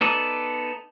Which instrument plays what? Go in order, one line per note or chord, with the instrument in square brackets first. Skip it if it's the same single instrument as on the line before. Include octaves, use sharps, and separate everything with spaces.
[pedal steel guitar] B3 D#4 A4 D5